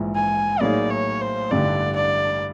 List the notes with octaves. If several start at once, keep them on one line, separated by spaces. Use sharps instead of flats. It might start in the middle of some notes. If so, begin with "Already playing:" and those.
Already playing: A#1 G#2 E3
G#5
A2 F#3 A#3 D#4 G#4 D5
C#5
C5
A1 G2 D3 D5
D5